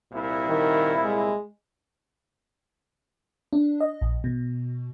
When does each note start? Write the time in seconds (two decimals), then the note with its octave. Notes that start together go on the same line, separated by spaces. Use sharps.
0.12 C2 A#2 E4
0.48 D#3
1.04 G#3
3.53 D4
3.81 D#5
4.01 A#1
4.24 B2